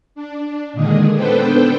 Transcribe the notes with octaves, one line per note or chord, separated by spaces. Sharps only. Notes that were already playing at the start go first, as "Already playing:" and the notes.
D4
A#2 D3 D#3 G#3 G#4
B3 D4 A4 B4 C5 G5